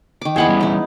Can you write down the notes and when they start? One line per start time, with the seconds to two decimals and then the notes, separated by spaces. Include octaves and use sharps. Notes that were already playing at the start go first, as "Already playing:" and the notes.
0.22 D#3 D6
0.36 E2 B3 E4 G#4 C5 F#5
0.48 E3 G3 C#4
0.61 D#4 E4